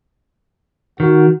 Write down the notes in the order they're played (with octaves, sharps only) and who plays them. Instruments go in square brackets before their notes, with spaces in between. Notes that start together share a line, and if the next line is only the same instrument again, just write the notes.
[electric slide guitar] D#3 [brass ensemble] F#4